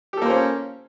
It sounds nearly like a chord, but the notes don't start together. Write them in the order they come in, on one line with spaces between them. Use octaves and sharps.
G4 A4 A#3 C5 C#4